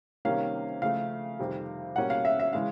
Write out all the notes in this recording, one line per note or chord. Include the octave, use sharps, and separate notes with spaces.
C3 D#3 G3 A#3 C#4 F5
C#3 F3 A3 F5
F2 C3 D#3 G3
B2 G3 A#3 C#4 F#5
F5
E5
E5
C#3 E3 G#3 C#4 F5